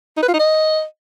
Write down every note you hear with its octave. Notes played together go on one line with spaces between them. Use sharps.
D#4
B4
F4
D#4
D#5